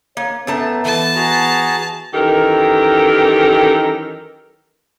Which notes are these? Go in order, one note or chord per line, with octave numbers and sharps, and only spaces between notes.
A#3 C#5
F#2 A3 B3 A5
E3 A5
F#4 G#4 A#5
F#2 D#3 E3 G4 A4 A#4